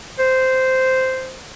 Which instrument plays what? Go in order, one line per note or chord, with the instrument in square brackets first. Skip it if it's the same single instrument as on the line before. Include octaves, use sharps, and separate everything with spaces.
[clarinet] C5